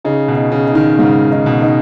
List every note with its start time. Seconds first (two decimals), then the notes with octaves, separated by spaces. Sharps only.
0.04 C#3 D#4
0.28 B2
0.36 D#4
0.52 C#3
0.67 D#4
0.75 D#3
0.99 G#2 C#3
1.31 D#4
1.46 B2
1.62 D#4